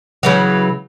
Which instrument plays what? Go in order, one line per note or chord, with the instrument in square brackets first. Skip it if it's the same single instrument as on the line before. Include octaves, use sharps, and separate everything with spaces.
[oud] C#3 E3 F#3